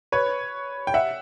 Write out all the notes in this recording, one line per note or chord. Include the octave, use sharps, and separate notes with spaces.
B4 C#5
G5
E5 F#5